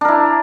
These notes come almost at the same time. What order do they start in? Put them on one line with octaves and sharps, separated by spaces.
D4 A#4 E4